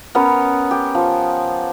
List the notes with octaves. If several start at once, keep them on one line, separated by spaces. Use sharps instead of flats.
B3 C#4 A#4 C#5
G4
F3